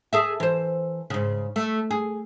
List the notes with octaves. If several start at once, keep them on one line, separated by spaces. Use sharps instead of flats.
G#4 A4 E5
E3 C5
G#2 C#3
A3
G#4